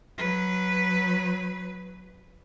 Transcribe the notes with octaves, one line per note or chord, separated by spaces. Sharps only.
F#3 B4